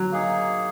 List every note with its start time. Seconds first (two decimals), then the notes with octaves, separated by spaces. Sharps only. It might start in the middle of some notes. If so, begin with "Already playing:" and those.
Already playing: F#3
0.12 A#3 D#4 G#4